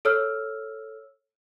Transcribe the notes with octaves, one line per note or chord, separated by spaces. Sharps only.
A4 C#5 E6 F6